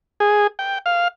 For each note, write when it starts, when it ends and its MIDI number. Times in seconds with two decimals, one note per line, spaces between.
0.20 0.47 68
0.59 0.78 79
0.86 1.08 77